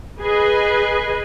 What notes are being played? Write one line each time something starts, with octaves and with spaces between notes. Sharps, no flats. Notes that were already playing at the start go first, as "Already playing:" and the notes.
G#4 B4 D#5 G#5